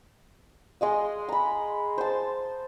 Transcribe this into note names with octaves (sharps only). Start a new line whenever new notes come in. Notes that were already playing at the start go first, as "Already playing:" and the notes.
G#3 D#5 F5
A#5 B5
C5 A5